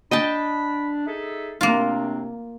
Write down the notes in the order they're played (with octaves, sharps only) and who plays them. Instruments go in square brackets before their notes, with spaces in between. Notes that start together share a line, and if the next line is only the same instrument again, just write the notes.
[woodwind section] D4 [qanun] D#5 G5 A5 [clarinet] B5
[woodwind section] D#4 G#4 A4 [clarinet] E5
[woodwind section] F#2 C3 C4 [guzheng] A#3 F4 [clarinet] D4